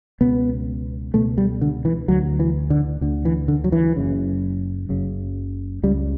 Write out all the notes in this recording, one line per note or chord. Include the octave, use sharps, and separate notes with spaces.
C#2 B2 B3
C#2 B2 A3
G3
D3
E3
D2 D3 F#3
E3
D3
D2 D3
E3
D3
F#3
E3
F#1 F#2 C#3
F#1 F#2 C#3
C#2 C#3 G3